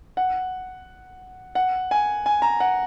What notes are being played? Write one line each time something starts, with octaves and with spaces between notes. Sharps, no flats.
F#5
F#5
G#5
G#5
A#5
F#5